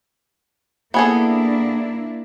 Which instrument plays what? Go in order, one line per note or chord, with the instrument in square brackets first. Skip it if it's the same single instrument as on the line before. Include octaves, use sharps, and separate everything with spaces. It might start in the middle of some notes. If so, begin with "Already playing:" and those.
[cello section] A#3 D4 E4 [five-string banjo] B3 G#4 A4